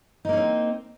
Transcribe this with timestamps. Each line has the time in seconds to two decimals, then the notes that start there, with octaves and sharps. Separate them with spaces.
0.25 D#4
0.29 A#3
0.33 C#4
0.37 C4